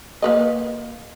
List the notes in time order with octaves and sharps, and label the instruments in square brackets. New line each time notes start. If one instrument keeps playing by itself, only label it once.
[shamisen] A#3 B4 D#5